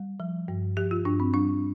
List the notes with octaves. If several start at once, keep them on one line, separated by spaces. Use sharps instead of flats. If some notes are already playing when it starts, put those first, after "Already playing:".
Already playing: G3
F3
G2
F3 G4
F4
G2 D4
C4
G3 D4